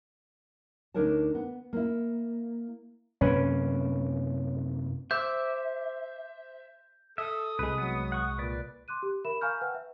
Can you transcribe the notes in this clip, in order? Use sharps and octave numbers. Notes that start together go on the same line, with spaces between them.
D2 D4 D#4 A#4 C#5 A5
B3
A#3 E4
F#2 C3 A#3 C#4 B4
C5 E5 D6 E6 G6
A4 E5 D#6
C2 G#3 B4
F#3 B3
F#5 C#6
A#2 B4 D5
C6 D6 F#6 D#7
G4
A#4 E5 B5 E7
F5 G#5 A#5 C#6 F6 G6
B4 F#5 G5
E5